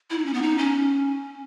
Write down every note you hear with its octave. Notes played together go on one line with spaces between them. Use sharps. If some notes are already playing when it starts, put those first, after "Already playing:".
E4
D#4
C#4
B3
D#4
C#4